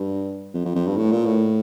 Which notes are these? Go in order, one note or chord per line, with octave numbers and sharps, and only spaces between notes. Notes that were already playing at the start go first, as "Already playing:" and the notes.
Already playing: G2
F2
F2
F2
G2
A2
A#2
A2